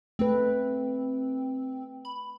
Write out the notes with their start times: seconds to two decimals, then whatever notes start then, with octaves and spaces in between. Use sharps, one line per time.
0.19 A3 C4 B4
2.05 B5